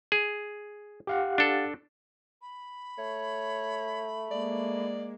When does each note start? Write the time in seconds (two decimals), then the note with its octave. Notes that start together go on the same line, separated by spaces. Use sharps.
0.12 G#4
1.07 G4 F5 F#5
1.38 D4 A4
2.41 B5
2.98 A3 C#5
4.31 G#3 A#3 D5